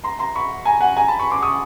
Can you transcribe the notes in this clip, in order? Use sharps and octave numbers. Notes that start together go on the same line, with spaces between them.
A#5 C6
A#5 C6
B5 C#6
G#5 A#5
F#5 G#5
G#5 A#5
A5 B5
B5 C#6
C6 D6
C#6 D#6